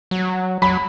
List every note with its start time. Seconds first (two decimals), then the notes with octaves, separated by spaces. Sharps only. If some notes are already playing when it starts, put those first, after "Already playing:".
0.11 F#3
0.62 F#3 B5